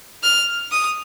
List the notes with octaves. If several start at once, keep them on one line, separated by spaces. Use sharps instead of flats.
F6
D#6